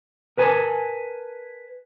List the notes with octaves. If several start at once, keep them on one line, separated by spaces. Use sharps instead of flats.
A#4 B4 G#5 A5